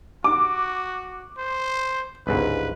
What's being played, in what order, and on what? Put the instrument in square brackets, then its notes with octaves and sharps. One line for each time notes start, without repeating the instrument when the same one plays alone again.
[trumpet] F#4 [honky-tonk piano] D6
[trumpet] C5
[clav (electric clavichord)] G1 C#2 G#2 [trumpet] B4